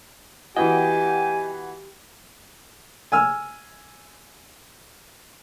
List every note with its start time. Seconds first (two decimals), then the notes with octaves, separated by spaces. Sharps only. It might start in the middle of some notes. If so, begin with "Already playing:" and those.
0.56 E3 B3 F#4 G4 D#5 G5 G#5
3.12 G#5 E6 F6